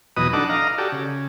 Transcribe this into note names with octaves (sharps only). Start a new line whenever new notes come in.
E2 B2 F#3 B4 D#5 D#6
D4 D#4 A4 F#5 D6
D#5 F5 A#5
F#4 G4 A4 D5
C#3